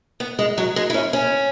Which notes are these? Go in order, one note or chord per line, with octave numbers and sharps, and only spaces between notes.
B3
G#3
F#3
G#3
E4
C#4
C#4